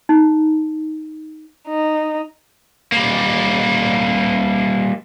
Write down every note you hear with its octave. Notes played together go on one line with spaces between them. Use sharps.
D#4
D#4
G3 A#3